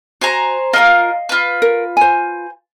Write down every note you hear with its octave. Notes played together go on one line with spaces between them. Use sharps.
F#4 C5 G#5 A#5
F4 A#4 D#5 F5
F4 B4
A#4
C5 G#5